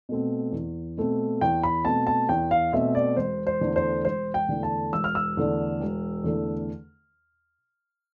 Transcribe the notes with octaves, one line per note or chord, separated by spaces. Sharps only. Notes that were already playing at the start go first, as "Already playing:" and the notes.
B2 A3 C4
E2
B2 A3 C4
E2 G5
B5
B2 A3 C4 A5
A5
E2 G5
F5
B2 A3 C4 E5
D5
E1 C5
C5
E2 D3 A3 D4
C5
E1 C5
G5
E2 D3 A3 D4
A5
E1 E6
F6
E6
E2 D3 A3 D4
E1
E2 D3 A3 D4